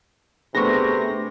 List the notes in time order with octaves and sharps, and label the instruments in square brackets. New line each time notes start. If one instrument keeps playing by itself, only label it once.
[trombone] C3 [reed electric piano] A3 B3 G#4 [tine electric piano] D4 B4 [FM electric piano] C#6 A#6